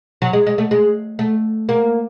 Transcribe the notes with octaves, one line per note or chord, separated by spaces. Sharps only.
F#3
G#3
G#3
A3
G#3
A3
A#3